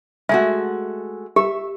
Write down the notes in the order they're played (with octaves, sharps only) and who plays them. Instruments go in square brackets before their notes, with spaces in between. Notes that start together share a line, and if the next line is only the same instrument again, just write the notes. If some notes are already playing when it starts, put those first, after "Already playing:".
[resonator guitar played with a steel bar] G#3 A3 F#4 [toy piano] E5
[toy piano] G4 [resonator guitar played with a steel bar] E5